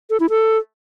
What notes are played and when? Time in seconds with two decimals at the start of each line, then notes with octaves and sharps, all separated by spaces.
0.10 A4
0.20 E4
0.30 A4